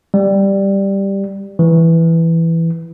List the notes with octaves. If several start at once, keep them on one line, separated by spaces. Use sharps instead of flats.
G3
E3